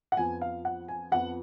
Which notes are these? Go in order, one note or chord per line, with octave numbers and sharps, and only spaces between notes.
F#5
F2 F3 B3 G#5
F5
F#5
G#5
F2 F3 B3 F#5